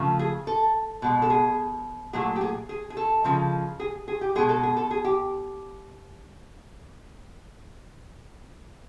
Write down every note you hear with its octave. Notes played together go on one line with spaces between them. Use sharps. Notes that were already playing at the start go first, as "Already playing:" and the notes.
Already playing: C#3 F3 A3
G#4
A4
B2 G#3
A4
G#4
A#2 F#3 A3 G#4
G4
G#4
G#4
G#4
A4
C#3 F3 G#3
G#4
G#4
G4
B2 G#3 G#4
A4
G#4
A4
G#4
G4